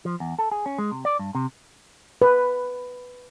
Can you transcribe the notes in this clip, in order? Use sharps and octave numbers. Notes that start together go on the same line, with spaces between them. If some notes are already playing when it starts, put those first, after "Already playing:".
F3
E2
A4
G#4
C#4
G#3
C3
D5
G2
C3
B4